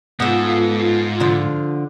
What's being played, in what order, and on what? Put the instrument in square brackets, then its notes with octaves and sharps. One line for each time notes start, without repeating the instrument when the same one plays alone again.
[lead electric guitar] G#2 [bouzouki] B3 A4 [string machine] F4
[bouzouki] D3 F3